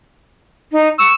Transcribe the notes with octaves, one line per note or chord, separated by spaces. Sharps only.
D#4
C#6 E6